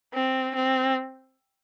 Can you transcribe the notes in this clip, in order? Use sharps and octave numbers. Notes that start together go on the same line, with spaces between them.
C4
C4